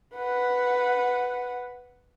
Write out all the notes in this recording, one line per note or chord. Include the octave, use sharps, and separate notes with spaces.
B4 F#5